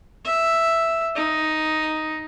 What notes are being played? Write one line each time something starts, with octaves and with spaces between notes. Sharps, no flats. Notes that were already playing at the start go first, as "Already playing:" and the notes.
E5
D#4